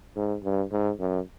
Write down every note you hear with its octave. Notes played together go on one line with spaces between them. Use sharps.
G#2
G2
G#2
F#2